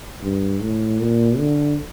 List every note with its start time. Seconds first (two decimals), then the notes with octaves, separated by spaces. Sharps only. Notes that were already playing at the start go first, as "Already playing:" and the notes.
0.23 G2
0.62 A2
1.01 A#2
1.38 D3